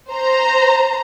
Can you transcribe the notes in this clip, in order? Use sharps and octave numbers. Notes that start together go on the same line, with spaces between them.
C5 A#5